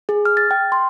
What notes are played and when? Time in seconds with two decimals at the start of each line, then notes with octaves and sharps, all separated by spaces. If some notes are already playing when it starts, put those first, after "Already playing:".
0.09 G#4
0.25 F6
0.37 A6
0.51 G5
0.72 C6